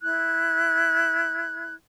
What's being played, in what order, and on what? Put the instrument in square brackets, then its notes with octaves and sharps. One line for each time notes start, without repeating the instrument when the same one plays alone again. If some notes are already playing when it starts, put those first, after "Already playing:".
[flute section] E4 F#6 G#6